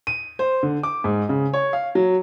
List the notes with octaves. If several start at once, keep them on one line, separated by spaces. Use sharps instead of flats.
D#7
C5
D3
D6
G#2
C#3
C#5
F5
F#3